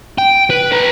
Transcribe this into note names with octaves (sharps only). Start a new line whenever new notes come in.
G5
B4
B4 A#5